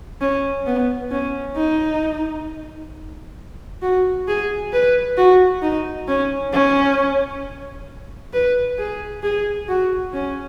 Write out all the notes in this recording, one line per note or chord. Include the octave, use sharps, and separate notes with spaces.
C#4
B3
C#4
D#4
F#4
G#4
B4
F#4
D#4
C#4
C#4
B4
G#4
G#4
F#4
C#4